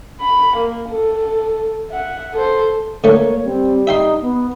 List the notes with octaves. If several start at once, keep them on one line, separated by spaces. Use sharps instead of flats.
B5
A#3
A4
E5 F#5
A4 C5
D3 A3 A#3 C#5
G3 C4
D#4 E5 G5 C6
B3